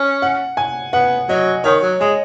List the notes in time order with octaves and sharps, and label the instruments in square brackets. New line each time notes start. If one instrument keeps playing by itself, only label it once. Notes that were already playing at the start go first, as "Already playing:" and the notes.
Already playing: [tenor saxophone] C#4
[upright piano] F#5
G#5
[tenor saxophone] B3 [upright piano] F#5
[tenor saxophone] F#3 [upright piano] D#5
[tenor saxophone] D#3 [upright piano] C#5
[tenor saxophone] F#3
[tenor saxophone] G#3 [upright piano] D#5